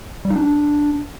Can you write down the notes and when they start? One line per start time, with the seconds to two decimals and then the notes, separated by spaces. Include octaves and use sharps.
0.25 G3
0.30 D#4
0.36 D4